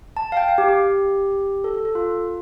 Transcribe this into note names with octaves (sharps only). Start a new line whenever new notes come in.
A5
F5
G5
F5
G4
G4
A4
A4
A4
F4